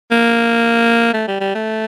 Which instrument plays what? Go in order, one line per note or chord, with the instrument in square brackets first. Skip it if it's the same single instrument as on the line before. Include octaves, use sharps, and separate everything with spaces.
[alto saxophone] A#3
A3
G3
G3
A3